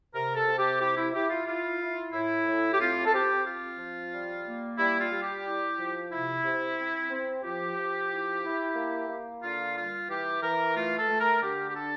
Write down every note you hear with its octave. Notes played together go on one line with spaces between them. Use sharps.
C3 A#4
A4
C3
G4
E4 G4
E4
E4 G4
F4
E4 F4
E4
A2 E4
A2
G4
C4 F4
A4
C4 G4
C4 F4
F3
G3
A#3
G3 E4
F4
G3
G4
E4
F3
C3 E4
C3
C4
C4
F3 G4
F3
E4
E4
A#3
A#3
D3 F4
G3 F4
E3 G4
E3 A#4
A3 F4
A4
A3
A#4
D3 G4
G4
D4 A4